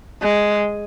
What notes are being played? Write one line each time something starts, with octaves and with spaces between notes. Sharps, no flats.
G#3